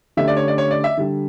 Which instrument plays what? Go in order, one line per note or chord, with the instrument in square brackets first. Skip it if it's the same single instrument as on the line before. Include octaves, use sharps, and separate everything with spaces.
[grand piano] D3 A3 C#4 G4 [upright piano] E5
[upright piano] D5
C#5
D5
C#5
D5
E5
[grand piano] D3 G3 D4